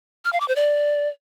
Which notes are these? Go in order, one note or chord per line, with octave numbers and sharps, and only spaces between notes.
F6
F5
D6
C5
D5